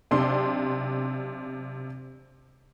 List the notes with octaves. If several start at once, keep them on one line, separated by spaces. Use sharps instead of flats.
B1 C3 D4 C6